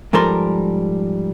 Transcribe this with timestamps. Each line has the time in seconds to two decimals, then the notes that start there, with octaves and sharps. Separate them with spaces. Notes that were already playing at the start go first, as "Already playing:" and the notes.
0.13 G#2 F3 G3 A4 A#4 C6